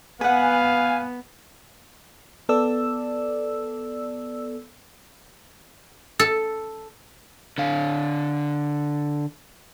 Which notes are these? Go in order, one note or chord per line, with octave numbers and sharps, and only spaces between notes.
B3 B4 F5 F#5 G#5
B3 A4 D5 E6
A4
D3 F5